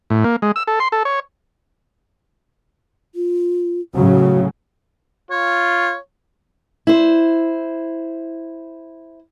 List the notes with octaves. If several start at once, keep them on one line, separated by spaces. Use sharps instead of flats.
A2
A#3
G#3
E6
A4
C6
A4
C#5
F4
A2 C#3 F#3 F#4
F4 C#5
E4 C5